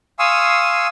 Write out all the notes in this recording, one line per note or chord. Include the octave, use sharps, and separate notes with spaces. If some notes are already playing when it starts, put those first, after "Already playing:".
F5 G#5 C6 C#6 D#6 E6